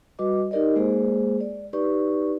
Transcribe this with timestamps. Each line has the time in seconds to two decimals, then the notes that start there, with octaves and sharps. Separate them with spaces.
0.19 G3 F#4 B4 D#5 D6
0.51 D#4 G4 A#4 D5 D#5
0.76 G#3 A#3 G#4 C5
1.40 D5
1.73 D#4 G4 B4 D5 C#6